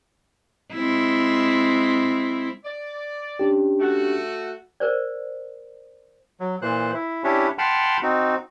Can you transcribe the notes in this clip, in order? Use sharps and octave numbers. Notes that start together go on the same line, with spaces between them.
G#3 C4 E4
D5
C#4 D4 G4
A3 F#4
A#4 C5 D5
F#3
A#2 E3 C5 F#6
E4
C#4 D4 E4 G4 C#5
F#5 G5 A5 B5 C6 F6
C4 D#4 F#4